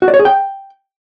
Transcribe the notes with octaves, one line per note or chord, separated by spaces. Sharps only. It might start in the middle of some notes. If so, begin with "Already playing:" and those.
F#4
D5
C#5
G#4
G5